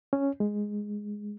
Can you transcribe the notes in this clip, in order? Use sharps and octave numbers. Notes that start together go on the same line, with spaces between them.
C#4
G#3